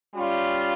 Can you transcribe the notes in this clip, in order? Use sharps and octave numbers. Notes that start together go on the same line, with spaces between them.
G3 C#4 F4